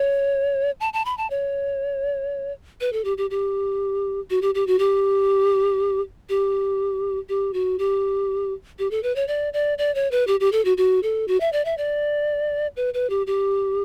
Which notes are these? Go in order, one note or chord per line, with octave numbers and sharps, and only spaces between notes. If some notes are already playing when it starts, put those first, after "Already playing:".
Already playing: C#5
A5
A5
B5
A5
C#5
B4
A4
G4
G4
G4
F#4
G4
G4
F#4
G4
G4
G4
F#4
G4
G4
A4
B4
C#5
D5
D5
D5
C#5
B4
G4
G4
A4
F#4
F#4
A4
F#4
E5
D5
E5
D5
B4
B4
G4
G4